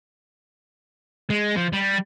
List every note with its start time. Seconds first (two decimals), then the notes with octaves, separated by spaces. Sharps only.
1.30 G#3
1.57 F3
1.73 G3